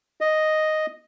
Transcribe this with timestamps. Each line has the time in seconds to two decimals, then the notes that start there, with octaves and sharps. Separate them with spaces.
0.21 D#5